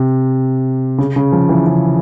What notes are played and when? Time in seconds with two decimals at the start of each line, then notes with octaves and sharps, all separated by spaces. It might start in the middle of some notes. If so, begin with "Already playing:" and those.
Already playing: C3
0.98 C#3
1.16 C#3
1.32 F3
1.49 E3
1.66 C#3